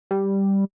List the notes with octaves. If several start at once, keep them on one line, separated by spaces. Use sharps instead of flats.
G3